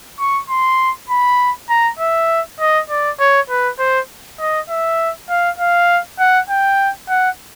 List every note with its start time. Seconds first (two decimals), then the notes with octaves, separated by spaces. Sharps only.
0.20 C#6
0.50 C6
1.09 B5
1.70 A#5
1.99 E5
2.60 D#5
2.90 D5
3.20 C#5
3.50 B4
3.79 C5
4.40 D#5
4.69 E5
5.29 F5
5.59 F5
6.19 F#5
6.50 G5
7.09 F#5